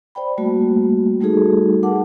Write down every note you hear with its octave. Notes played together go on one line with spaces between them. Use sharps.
C5 D5 G5 B5
G3 A3 A#3 F#4
G3 A3 D#4 F#4 G#4 A4
A#4 F#5 A5 D6